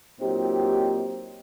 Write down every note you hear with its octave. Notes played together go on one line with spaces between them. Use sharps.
A#2 F#3 C4 D#4 G4